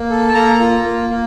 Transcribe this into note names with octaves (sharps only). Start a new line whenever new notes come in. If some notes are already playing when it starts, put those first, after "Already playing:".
Already playing: A#3
A4
A5
A#3 A#5
F4
A#3
A#3